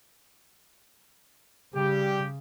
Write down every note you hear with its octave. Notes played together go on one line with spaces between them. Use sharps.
C#3 G3 G4